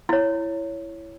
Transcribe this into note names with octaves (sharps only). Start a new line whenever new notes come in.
E4 C#5